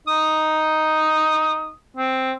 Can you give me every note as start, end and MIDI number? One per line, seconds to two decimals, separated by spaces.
0.07 1.70 63
0.07 1.74 87
1.97 2.33 60